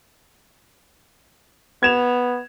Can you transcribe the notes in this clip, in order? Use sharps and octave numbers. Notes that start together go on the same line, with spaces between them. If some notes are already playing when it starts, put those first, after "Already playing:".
B3 G#6 E7 F7